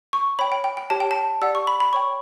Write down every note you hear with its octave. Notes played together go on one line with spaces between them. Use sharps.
C#6
C#5 G5 B5
G5
G5
G5
G4 C#5 G5 A5
G5
A5
G4 D5 F#5 E6
C#6
B5
B5
C#5 G5 C#6